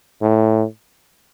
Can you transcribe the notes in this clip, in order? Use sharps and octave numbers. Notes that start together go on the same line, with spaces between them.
A2